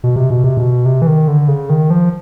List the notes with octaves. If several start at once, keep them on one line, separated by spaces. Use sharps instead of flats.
B2
C3
B2
C3
B2
C3
E3
D#3
D3
C#3
D#3
F3